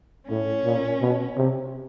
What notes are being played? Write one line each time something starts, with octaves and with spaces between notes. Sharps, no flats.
A2 C#4
A#2
B2
C3